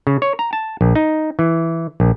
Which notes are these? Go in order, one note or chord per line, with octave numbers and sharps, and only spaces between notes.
C#3
C#5
A#5
A5
A#1
D#4
E3
A#1